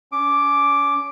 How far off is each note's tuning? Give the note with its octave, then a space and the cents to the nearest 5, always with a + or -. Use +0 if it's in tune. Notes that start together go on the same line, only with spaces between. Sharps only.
C#4 +30 D6 +0